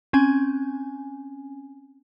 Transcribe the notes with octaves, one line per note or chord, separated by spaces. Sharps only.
C4 C#4 G#5